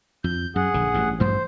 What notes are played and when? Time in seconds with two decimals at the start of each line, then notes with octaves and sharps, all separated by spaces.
0.24 F2 G6
0.56 F#2 G#4 F#5
0.74 A#1 D3
0.94 A1 G2
1.20 A1 G2 F3 C5